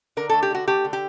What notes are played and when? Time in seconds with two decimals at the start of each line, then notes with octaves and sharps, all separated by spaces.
0.17 D3 A#4
0.29 A4
0.34 A3
0.43 G4
0.50 D3 F#4
0.67 A3 G4
0.84 D3
0.93 G4